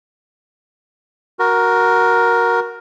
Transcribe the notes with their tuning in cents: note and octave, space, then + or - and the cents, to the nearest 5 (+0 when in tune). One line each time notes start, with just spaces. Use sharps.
F#4 +0 A#4 +10